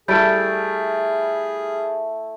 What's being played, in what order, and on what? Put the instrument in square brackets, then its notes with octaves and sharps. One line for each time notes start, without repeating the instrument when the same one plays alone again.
[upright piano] G3 [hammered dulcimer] A3 E4 [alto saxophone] G#4 [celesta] G6 A6 D7